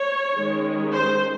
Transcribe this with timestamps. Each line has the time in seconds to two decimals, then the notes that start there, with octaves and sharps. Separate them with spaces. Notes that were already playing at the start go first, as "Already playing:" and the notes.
Already playing: C#5
0.33 D#3 G#3 C#4
0.93 C5